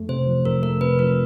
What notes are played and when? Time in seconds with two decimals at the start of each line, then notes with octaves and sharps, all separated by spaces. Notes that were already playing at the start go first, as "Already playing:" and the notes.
Already playing: F2 A3
0.09 C3 C5
0.27 F3
0.45 F2 A#4
0.63 A3 A#4
0.81 C3 B4
0.99 F3 A#4